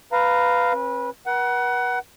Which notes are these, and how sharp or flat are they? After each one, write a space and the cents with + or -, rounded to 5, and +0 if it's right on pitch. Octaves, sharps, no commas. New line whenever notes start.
B4 +10 F5 +0 A#5 -10
C4 +45 B4 -25
B4 -45 F#5 +20